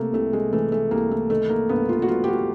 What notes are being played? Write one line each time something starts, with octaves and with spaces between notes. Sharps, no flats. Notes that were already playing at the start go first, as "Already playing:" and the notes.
Already playing: C3 A3 A#3
C2 A3
G#3
E3 A3
A3
C2 A#3
A3
D#3 A3
A#3
G2 B3
F4
F#4
F#3 F4
G4
F#4